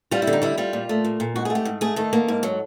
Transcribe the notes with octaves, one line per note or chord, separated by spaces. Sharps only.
G3 F4
E4
D3
D#4
G3 E4
G3 F4
A#2
A3
A#2
A#2
G#2 F#4
G#4
A3
G4
G#2
A3 G#4
D#3 A4
A#3
G#2
F#3